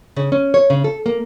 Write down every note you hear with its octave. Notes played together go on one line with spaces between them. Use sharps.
C#3
C#4
C#5
C#3
A4
A#3